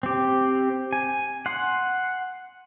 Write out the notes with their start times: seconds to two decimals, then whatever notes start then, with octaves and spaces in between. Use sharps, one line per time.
0.03 C4 G4
0.93 G#5
1.46 F#5 C6